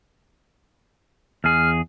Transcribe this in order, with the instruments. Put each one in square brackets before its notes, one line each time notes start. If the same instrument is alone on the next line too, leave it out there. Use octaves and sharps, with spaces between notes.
[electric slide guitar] E2 G#4 [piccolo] F6